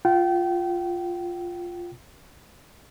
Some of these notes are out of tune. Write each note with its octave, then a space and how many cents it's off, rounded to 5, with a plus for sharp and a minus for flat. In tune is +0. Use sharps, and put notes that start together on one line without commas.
F4 +0 G5 -30